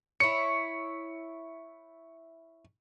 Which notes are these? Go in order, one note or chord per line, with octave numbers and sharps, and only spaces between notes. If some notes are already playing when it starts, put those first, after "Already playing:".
E4 C#5 C#7